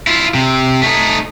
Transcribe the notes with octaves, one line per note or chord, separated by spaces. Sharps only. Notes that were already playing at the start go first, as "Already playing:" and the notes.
E4 F4
C3
A3 D#4